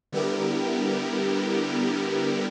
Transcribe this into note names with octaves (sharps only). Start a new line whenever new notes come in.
D3 G3 B3 E4 G4 A#4